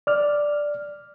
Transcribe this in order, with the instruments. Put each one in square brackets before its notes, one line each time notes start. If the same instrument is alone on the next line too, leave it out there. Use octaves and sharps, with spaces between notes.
[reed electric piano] D5 F6